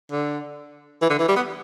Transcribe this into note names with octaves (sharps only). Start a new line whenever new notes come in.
D3
E3
D3
E3
G3
B3